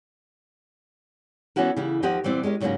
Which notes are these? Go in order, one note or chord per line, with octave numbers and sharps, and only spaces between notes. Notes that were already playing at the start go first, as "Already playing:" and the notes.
E3 B3 C#4 E4 F#4 A#4
C#3 E3 E4 G4
D#2 F3 G4 A#4 D#5 F#5
A#2 E3 G3 C4 D5
G#3 C#4 G4 A#4
G#2 C#3 F#3 G3 A#3 C#4